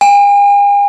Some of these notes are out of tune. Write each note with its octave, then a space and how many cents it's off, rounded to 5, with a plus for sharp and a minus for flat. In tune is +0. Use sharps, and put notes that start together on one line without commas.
G#5 -45